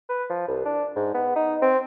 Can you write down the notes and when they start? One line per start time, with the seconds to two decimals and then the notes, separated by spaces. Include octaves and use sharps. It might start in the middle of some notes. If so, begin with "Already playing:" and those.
0.09 B4
0.29 F3
0.48 C2
0.65 D4
0.96 G#2
1.14 B3
1.36 D#4
1.61 C4